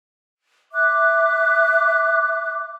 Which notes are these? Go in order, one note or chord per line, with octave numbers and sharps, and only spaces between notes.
E5 D6 F#6